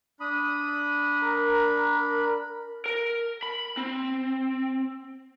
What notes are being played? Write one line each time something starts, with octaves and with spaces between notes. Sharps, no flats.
D4 B5 D#6
A#4
A#4
B5
C4